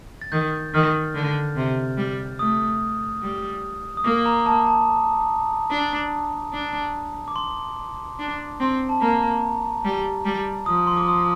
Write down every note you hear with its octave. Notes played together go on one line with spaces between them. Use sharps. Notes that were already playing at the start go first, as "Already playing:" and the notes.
A6
D#3 G6
D#3 F6
D3
C3
G3
A3 D#6
G3
D#6
A#3 D6
A#5
A5
A5
D4
D4
D6
C6
D4
C4
A5
A#3 A#5
G3
G3
F3 D#6
C6
D6
D#6